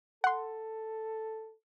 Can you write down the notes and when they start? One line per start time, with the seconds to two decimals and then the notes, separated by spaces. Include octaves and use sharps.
0.24 A4 F#5 C6